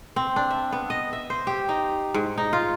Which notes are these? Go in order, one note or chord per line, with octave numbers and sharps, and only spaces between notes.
C4
D4
E5
B3
D#5
E5
C5
G4
D#4
G#2
D#4
F4